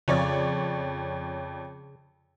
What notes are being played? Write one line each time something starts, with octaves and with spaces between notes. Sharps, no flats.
F2 C#3 C#5 D5